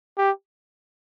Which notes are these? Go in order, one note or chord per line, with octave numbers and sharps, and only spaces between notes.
G4